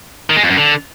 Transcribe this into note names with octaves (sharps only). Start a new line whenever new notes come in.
D#3
G#3
F2
F#2
D3